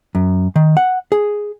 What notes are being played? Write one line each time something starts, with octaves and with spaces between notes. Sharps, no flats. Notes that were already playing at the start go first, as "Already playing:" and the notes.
F#2
D#3
F#5
G#4